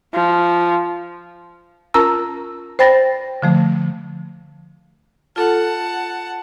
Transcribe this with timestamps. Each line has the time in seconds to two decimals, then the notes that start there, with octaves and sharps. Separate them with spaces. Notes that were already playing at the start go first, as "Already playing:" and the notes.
0.14 F3
1.94 C#4 F4 A#4 A5 A#5 E6
2.79 C5 D5 G5 B5 A6 A#6
3.42 D3 F3 A3
5.36 F4 A4 F#5 A5